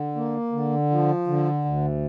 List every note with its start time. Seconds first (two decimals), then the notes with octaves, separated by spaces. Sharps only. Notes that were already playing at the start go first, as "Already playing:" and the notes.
Already playing: D3
0.16 A#3
0.52 D3
0.90 F3
1.27 D3
1.65 D2